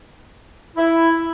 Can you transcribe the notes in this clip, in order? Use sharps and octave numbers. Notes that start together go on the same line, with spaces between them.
E4